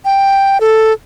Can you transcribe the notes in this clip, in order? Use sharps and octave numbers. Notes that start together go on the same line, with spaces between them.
G5
A4